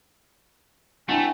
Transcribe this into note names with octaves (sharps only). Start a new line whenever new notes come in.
A3 C4 D4 E4 F#4 G#5